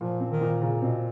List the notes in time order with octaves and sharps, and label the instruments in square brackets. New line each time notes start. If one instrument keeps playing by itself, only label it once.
[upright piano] A#2 [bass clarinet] F3
[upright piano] C4
[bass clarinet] D#3
[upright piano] A#2
[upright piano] A#2 [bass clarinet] C#3
[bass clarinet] B2 [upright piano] C4